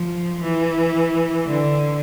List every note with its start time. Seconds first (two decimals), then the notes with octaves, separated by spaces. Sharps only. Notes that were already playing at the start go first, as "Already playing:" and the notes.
Already playing: F3
0.43 E3
1.45 D3